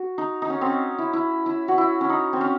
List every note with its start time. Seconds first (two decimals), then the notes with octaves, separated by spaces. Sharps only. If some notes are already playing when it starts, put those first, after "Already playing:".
Already playing: F#4
0.18 D#4
0.42 D#4
0.50 C#4
0.61 C4 C#4
0.98 E4
1.13 E4
1.46 E4
1.68 F#4
1.78 E4
2.01 C#4
2.09 D#4
2.33 C4
2.41 C#4